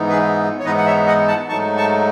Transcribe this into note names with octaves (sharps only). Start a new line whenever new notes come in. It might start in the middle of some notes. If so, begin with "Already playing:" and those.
Already playing: G#2 E3 B3 D#4
G#4 B4
C#5
G#2 E3 B3 D#4 B4 D#5
F#5
C#5 E5
D#5 F#5
F#5 A5
G#2 F#3 A3 D#4 A5 C#6
A5 C#6